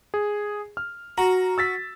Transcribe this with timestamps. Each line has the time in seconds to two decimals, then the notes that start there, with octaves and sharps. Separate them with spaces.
0.14 G#4
0.77 F6
1.18 F#4 A#5
1.58 E6 A6 B6